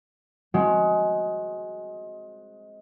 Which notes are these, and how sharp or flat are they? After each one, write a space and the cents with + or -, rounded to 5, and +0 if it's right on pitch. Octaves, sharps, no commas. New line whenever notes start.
G#3 +15 C4 +20 F#4 +0